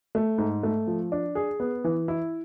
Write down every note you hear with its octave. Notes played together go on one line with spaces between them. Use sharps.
A3
G#2
A3
F3
D4
G#4
B3
E3
E4